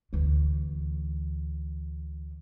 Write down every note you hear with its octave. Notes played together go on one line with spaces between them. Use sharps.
D2 E3